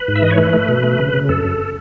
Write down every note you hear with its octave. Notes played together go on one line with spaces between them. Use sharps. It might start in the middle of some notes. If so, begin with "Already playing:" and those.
Already playing: B4
G#2
E5
E3 D#5
C#5
A3 B4
A3
B2
A3
C#3
C#3
F#2 A4
F#2